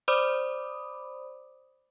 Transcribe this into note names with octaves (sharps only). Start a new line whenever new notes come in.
C5 D5 B5 D6 D#6